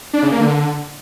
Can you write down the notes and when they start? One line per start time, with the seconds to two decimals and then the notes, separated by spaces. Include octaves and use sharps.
0.13 D4
0.23 C#3
0.32 A#3
0.41 D3